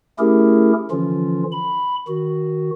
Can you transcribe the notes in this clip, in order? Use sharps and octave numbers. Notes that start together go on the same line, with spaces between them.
A3 C#4 E4 G4 G#4 A#4
D3 E3 F3 C#4 F4
B5
D#3 F#4